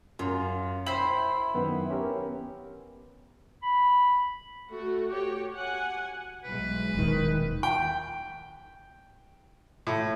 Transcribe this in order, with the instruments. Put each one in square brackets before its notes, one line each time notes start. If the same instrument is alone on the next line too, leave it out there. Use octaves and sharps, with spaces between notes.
[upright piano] F#2 [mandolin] F4
[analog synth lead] E4 [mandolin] C5 B5 [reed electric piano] G5 [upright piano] F#7
[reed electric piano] F#2 D#3 [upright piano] B3
[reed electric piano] C#4 G4 A#4
[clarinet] B5
[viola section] A3 F#4
F#4 G4 C#5
F#5 G#5
[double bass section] B1 E3 G#3 [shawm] B4
[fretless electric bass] D#1 D#3
[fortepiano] G5
A2